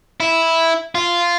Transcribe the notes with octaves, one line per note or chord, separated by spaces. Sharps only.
E4
F4